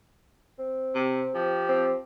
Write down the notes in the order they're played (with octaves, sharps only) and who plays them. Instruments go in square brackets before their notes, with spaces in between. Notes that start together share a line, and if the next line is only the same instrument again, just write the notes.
[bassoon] C4
[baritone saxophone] C3
[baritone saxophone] F3 [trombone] G4
[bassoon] C4